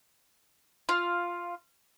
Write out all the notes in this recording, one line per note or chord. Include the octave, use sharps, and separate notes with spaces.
F4